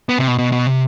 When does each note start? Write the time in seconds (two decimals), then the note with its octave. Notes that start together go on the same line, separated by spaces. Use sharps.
0.09 B3
0.18 C3
0.28 B2
0.38 B2
0.52 B2
0.67 C3